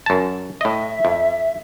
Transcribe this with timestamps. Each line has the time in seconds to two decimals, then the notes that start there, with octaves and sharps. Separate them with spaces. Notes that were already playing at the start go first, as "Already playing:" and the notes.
0.06 F#2 A5
0.61 A2 D#5 E5
1.05 F2